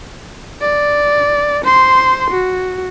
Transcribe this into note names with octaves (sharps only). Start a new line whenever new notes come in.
D5
C5 C6
F#4